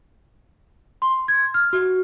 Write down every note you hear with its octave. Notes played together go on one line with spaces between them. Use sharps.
C6
G#6
F6
F#4